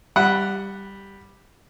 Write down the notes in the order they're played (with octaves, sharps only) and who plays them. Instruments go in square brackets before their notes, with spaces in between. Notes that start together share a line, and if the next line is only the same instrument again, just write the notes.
[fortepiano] G3 F#5